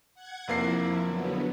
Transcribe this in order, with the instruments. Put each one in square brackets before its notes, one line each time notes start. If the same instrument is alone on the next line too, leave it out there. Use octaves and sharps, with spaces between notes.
[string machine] F#5 G#6
[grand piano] F1 A#3 C7 [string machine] F3 E4
[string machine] D3 F#3 B3